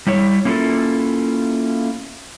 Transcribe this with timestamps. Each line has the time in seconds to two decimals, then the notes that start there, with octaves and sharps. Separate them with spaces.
0.07 G3 E4 C#5
0.45 A#3 C#4 E4 F4 A4